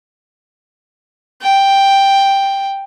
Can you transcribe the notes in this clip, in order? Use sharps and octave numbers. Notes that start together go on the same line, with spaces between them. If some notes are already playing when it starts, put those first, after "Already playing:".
G5